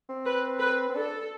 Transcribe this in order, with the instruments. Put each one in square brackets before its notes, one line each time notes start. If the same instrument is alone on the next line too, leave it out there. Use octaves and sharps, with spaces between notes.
[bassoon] C4
[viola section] B4
B4
[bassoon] C4
[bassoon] D4 [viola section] A4